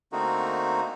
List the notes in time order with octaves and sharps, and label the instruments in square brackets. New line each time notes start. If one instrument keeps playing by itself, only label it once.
[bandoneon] D3 A3 A#3 C4 D#4 F#4